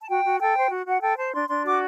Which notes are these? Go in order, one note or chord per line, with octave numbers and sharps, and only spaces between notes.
A5
F#4 G5
F#4
A4 G5
C5
F#4
F#4 F#5
A4 G5
C5 A5
D4 C6
D4 C6
F#4 D6